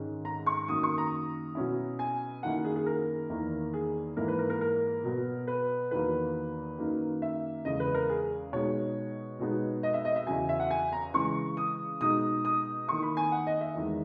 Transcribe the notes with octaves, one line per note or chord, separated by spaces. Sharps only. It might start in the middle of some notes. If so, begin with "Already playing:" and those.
Already playing: G#2 D#3 G#3 C#4
A#5
C#6
F#2 D#3 A#3 D#6
C#6
A#5
B2 F#3 C#4 E4
G#5
F#2 D#3 A#3 E4 F#5
G#4
G#4
A#4
E2 D#3 A#3 E4
G#4
G#2 E3 A#3 E4 A#4
B4
A#4
A#4
A#4
B2 F#3 B3
B4
E2 D#3 F#3 A#3 B4
F#2 D#3 A#3 D#4
E5
E2 C#3 G#3 D#5
B4
A#4
G#4
B2 G#3 D#4 C#5
B2 G#3 B3 D#4
D#5
E5
D#5
E5
E2 C#3 F#3 G#5
E5
F#5
G#5
A#5
C#3 E3 G#3 C#6
D#6
B2 G#3 D#4 D#6
D#6
D#3 A#3 E4 C#6
B5
G#5
F#5
D#5
E5
E2 D#3 G#3